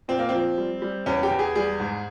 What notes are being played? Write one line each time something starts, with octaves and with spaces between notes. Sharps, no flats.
A#2 C4
A#3
F3 C4
G3
G3
E2 C#4
G4
E2
G#4
G3 G#4
G#2